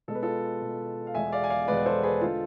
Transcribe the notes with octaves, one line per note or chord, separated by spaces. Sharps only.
B2 G#3 A4
B4
F4 A4
B2 G#3
F5
E2 B2 G#3 E5 G#5
D5 F5
G#5
D5 F5
E2 B2 G#3 B4 D5
A4 C5
G#4 B4
D3 G#3 F4 A4